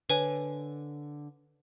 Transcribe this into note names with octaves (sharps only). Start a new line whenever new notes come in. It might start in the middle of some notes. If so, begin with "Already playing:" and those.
D3 B4 C#5 G#5